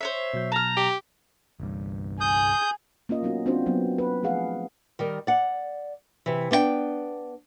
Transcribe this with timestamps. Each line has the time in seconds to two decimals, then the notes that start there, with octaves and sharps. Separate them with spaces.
0.01 C5 C#5 E5
0.34 B2 F#3 G6
0.52 A5 A#5 F6
0.77 G4
1.60 G1 C2 G2
2.21 G#4 D#6 G6
3.09 A#3 C#4 F4 D#5
3.22 F#3 B3 C#4 D#4 F#4
3.46 C4 D4 F4 F#4 C5
3.66 F#3 A#3 B3
3.98 B4
4.23 F3 A3 G#4 F5 F#5
4.99 D#3 G3 A#4
5.27 D5 F#5
6.26 C3 E3
6.51 B3 D4 C5 G5